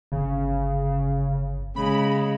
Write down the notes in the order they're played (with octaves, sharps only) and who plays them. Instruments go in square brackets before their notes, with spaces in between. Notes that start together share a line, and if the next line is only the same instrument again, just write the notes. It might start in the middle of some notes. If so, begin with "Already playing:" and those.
[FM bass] G1 [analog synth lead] C#3
[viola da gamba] C#3 G#3 [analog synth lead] B5